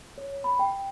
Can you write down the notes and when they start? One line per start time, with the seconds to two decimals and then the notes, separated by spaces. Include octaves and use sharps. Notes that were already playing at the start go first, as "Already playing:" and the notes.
0.18 C#5
0.44 B5
0.59 G5